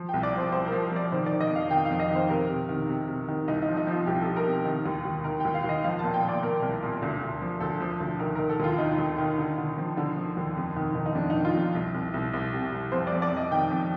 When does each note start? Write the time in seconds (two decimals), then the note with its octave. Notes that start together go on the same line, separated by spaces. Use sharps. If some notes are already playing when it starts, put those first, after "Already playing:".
Already playing: F3
0.09 G5
0.14 C2
0.23 D5
0.33 F3 C5
0.52 C2 C5
0.67 A#4
0.72 F3
0.91 F3 D5
1.12 D#3 C5
1.26 D5
1.32 D#3
1.41 D#5
1.51 F2 F5
1.71 D#3 G5
1.85 F5
1.90 F2
2.00 D#5
2.10 D#3
2.15 C5
2.29 C3 A#4
2.49 C3
2.69 D#3
2.89 C3
3.08 C3
3.28 D#3
3.48 C2 D#4
3.62 D#4
3.67 F3
3.77 D#4
3.87 F3 F4
4.06 C2 G4
4.21 A4
4.26 C3
4.36 A#4
4.46 C3
4.65 D#3
4.86 D#2
5.05 D#2
5.24 D#3 A#4
5.40 G5
5.45 D#2
5.54 F5
5.64 D#2 D#5
5.84 F3 F5
5.99 A5
6.04 A#2
6.14 G5
6.23 A#2
6.29 D5
6.43 A#2 A#4
6.62 C2
6.83 A#2
7.02 D2
7.22 D2
7.41 F3
7.60 D2 A4
7.80 F3
8.00 D2
8.19 D#3 A#4
8.35 A#4
8.39 D#3
8.49 A4
8.60 D#2 F4
8.78 D#3 D#4
8.98 D#2
9.18 D#3
9.38 D3
9.58 D3
9.78 F3
9.97 D3
10.17 F3
10.37 D#2
10.56 F2
10.76 D#3
10.95 D#3
11.06 D#4
11.15 F2 D4
11.30 D#4
11.35 D#3
11.45 F4
11.55 F2
11.75 C2
11.94 C2
12.14 C2
12.33 C2
12.53 C3
12.72 C2
12.92 F2 C5
13.07 D5
13.13 F2
13.22 D5
13.32 F2 D#5
13.51 D#3 G5
13.70 F2